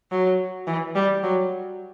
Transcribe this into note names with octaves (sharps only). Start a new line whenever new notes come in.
F#3
E3
G3
F#3